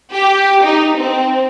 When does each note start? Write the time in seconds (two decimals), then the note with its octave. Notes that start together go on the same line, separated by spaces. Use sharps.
0.12 G4
0.62 D#4
0.96 C4